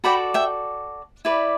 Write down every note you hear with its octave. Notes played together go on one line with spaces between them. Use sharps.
F#4 A4 D5 G5 B5
E5 G5
E4 B4 D5